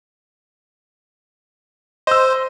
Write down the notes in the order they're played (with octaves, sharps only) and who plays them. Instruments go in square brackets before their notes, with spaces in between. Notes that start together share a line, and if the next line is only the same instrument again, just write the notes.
[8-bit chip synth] C5 [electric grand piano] D#5 E6